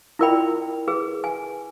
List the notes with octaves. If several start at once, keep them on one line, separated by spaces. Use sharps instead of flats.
E4 F4 A#4 D5 G5 B5
G#4 B4
G#5